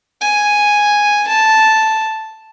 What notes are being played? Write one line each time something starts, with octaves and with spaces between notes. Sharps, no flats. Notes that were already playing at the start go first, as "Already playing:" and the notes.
G#5
A5